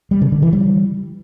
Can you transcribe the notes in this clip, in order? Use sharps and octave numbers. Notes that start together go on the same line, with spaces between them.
G3
C#3
D3
E3
G3